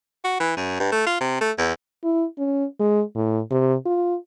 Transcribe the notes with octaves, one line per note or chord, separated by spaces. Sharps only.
F#4
E3
F#2
G2
A3
F4
C3
A3
E2
E4
C#4
G#3
A2
C3
F4